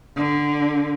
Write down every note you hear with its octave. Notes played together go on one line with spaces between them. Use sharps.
D3